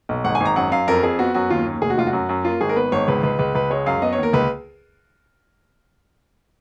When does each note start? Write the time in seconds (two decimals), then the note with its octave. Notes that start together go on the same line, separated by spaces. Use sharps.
0.09 B1
0.24 G#1 F#5
0.35 G#5
0.40 G#1
0.45 A#5
0.56 F#2 F#5
0.72 F#2 F5
0.87 F2 A#4
1.03 F2 G#4
1.19 B3 F#4
1.34 F#2 F#4
1.50 D#2 F4
1.66 D#2
1.82 F1 G#4
1.90 F#4
1.98 F1 F4
2.07 F#4
2.13 F#2
2.29 F#2
2.45 A#3 F4
2.61 G#1 G#4
2.69 A#4
2.76 B3 B4
2.92 G#1 C#5
3.08 C#2 B4
3.23 C#2 B4
3.39 C#2 B4
3.55 C#2 B4
3.70 G#3 C#5
3.86 F#2 F5
4.02 B3 D#5
4.13 C#5
4.18 D#2
4.23 A#4
4.33 C#2 B4